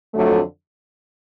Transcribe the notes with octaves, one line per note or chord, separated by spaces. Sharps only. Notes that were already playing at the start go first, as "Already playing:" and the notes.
F2 D3 F#3 A3